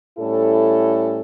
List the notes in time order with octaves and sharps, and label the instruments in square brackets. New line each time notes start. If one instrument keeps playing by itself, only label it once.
[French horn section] A2 G3 C#4 E4 A4